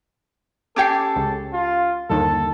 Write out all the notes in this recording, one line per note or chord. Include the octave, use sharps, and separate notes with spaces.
C#4 G4 A4 G5 D6 G#6 C7
C#2
F4
G1 D#2 A4